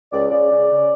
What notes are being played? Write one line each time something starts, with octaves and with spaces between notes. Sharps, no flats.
C#2 D5
C#3 D5
C#3
C#3